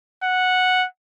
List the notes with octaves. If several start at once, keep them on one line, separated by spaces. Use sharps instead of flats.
F#5